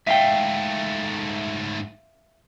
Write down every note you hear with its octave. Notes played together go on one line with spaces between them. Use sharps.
G#2 A3 E5 F5 G5